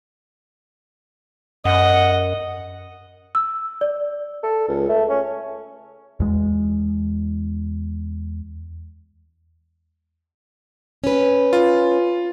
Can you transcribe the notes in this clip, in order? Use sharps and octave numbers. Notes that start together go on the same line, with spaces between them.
F#2 D#5 F#5
E6
D5
A4
C#2
A3
C#4
E2 G#3
C#4 B4
F4